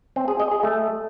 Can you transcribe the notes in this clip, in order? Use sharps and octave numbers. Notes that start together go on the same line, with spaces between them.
C4
G#4
D#5
G#4
A3